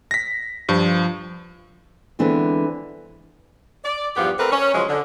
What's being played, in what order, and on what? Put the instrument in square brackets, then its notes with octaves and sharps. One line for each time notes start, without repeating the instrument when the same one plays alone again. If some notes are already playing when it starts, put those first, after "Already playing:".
[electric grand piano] A#6 B6
[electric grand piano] G2 [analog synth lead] F3
[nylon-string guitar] D3 E3 G#3 B3 C4
[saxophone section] D5
E2 G2 F3 B3 G4
A3 C4 A#4 B4
C#4
C#3 F3 F#3 G#3
D3